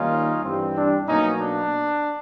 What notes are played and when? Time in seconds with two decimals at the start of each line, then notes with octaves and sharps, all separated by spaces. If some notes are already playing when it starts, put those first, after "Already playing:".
Already playing: D#3 G3 A#3 C#4 D#4 F4
0.43 G2 E3 G3 C4
0.75 D4
1.07 B2 F#3 A#3 C#4 D#4
1.41 D4